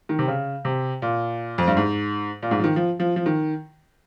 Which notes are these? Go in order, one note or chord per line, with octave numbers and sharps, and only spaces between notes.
D#3
C3
C#3
C3
A#2
F2
G2
G#2
A#2
G#2
F3
D#3
F3
F3
F3
D#3